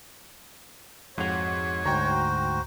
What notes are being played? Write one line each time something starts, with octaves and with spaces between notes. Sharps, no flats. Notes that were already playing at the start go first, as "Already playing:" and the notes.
F2 G#2 F#4 C#5
D2 G#2 F#4 C5 G5 A#5